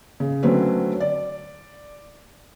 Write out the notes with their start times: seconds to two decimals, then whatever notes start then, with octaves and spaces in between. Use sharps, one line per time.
0.20 C#3
0.43 D3 F#3 A3 C4 C#4 B4
1.00 D5